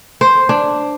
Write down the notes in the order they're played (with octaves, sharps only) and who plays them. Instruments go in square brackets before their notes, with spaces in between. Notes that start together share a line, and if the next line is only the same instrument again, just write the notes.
[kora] C5
D4